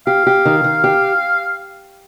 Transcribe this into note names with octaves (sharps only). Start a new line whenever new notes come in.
G4 F5
G4
D#3
D#3
G4